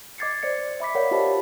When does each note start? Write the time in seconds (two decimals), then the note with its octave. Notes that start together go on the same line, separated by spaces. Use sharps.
0.18 D#5 D6 G#6 A6 C7 C#7
0.43 C5 D5 D#5 C#7
0.80 E5 B5 D6 B6
0.95 A#4 C#5 D5 F5 F#5
1.11 F4 G4 C5 D#5 A5 B5